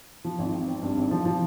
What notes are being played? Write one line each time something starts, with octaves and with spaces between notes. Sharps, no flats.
F3
G#1
C4
C4
G2
G#1
F3
F3